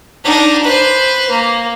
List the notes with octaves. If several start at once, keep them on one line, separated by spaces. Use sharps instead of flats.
D4 D#4
B4 C5
A#3